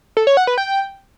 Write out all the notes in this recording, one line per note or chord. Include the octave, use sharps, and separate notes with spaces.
A4
C#5
F#5
B4
G5